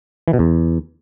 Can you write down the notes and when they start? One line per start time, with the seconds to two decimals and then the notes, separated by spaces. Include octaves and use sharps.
0.28 E3
0.33 B2
0.39 E2